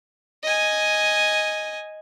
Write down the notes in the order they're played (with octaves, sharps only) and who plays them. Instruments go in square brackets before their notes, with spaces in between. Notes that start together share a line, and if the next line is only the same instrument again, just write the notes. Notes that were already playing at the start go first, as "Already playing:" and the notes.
[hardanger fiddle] D#5 G#5